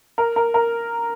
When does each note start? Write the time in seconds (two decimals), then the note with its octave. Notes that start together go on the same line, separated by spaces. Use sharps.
0.18 A#4
0.36 A#4
0.54 A#4